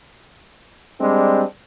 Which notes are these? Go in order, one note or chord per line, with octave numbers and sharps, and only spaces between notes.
G3 G#3 C4 D4